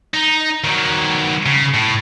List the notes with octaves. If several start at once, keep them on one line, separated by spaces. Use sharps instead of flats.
D#4
D#3 F#3
C#3
A2